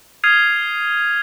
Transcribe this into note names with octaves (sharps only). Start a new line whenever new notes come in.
D#6 F6 G#6 C7 D#7 F7